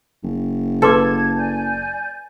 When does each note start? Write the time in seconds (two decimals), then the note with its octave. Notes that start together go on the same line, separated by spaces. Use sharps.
0.23 F#1
0.82 A4 B4 A5 C6 D6 G#6
1.36 D5 G#5 G6